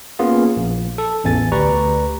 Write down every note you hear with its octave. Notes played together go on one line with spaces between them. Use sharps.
A#3 B3 C#4 F4 G#4
A#1
A4
A1 E2 G#5 A6
D2 G4 B4 D5 A#5 C#6